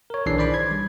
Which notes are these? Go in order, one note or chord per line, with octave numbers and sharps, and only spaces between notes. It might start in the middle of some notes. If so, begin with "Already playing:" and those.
A#4 C#5
B1 E3 D4 G#4 D5 C7
D#3 C5 D5 B5 D6
G#6
G3